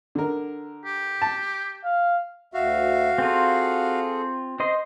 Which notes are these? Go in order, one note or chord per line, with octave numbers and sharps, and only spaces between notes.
D3 A#4
G4
A5
F5
D2 F#4 E5 F5
C4 F4 G#4 A4
C5 D#5 C6